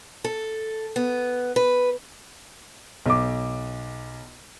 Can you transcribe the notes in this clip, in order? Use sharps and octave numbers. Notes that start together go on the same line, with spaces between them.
A4
B3
B4
B1 D6